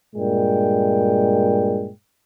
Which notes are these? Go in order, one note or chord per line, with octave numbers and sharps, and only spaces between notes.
G2 A#2 G#3 G5